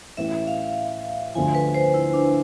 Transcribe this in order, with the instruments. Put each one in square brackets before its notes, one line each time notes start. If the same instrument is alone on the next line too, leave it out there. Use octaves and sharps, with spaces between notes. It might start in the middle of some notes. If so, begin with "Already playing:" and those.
[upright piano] A1 A2 E3 [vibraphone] E5
[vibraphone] F5
[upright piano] D2 D3 F3 [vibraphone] G#5
[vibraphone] B4
C5
E4
D4